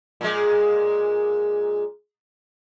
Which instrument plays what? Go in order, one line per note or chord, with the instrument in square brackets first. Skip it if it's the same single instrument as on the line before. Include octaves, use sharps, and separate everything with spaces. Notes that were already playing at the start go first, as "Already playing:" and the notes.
[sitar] A#2 G#3